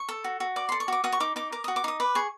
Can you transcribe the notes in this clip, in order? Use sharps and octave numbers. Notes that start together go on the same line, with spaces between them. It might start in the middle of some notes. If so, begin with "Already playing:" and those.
Already playing: C#6
A4
F#4
F#4
D5 D6
A4 C6
C#6
F#4 D6
F#4 D#6
C#6
D#4 D6
D#4 D6
A#4 D6
D#6
F#4
D6
D#4 D#6
B4 D6
G#4 C#6